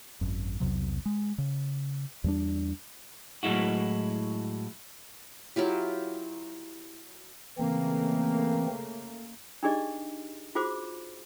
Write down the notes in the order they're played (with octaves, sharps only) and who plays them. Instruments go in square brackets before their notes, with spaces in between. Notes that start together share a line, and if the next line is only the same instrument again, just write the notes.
[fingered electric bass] G#1 F#2
B1 E2 C3 F#3
G#3
C#3
E2 G3 D4
[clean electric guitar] A2 F#3 G#3 E4 F#4
[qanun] F#3 E4 F4 G4
[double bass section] C#3 A3 A#3 [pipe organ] E3 C4
[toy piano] D4 D#4 G4 G#4 D5 D#5
F4 F#4 G#4 C5 D6